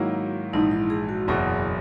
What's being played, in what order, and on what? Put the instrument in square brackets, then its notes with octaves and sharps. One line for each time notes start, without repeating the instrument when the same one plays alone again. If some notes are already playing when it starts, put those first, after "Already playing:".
Already playing: [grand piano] G#2 D#3 F#3 A#3 E4 [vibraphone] F#4
[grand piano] A#1 G#2 E3 [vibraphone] D#4
[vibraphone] E4
G#4
F#4
[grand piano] F#1 E2 B2 F#3 [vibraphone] G#4